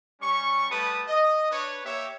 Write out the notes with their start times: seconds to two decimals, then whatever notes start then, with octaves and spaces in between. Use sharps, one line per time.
0.22 G3 C#4 C#6
0.70 G3 A3 B4 A5 D#6
1.08 D#5
1.51 D4 B4 C#5
1.84 A#3 G4 C#5 E5